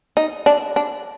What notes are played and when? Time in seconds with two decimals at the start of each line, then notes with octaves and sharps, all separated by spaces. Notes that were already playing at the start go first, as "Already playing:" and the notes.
0.17 D#4
0.46 D4
0.76 D4